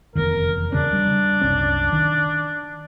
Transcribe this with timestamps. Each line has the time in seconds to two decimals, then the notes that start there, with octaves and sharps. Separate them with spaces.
0.15 F1 E2 D#3 A#4
0.72 E2 C#3 C#4 D4
0.93 G3
1.41 F#1 C2 C#4
1.92 D#3